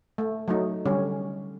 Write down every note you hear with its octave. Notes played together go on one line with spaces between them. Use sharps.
A3
F#3 A3 D#4
D3 G3 C#4